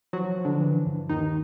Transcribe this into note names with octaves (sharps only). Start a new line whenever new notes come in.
F3 F#3 F#4
F3
D3 D4
E3
G2
D#2 D#3 D#4